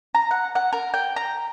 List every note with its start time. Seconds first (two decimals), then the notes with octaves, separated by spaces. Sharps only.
0.15 A#5
0.31 F#5
0.55 F#5
0.73 A#4
0.94 G5
1.16 A#5